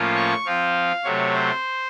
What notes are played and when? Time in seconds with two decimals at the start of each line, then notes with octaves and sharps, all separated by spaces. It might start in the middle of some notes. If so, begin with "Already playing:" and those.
Already playing: A2 F3 A#3 C#4 F4
0.16 C#6
0.45 F3 C4 F4 F5
1.04 C3 F#3 A3 C#5
1.33 C5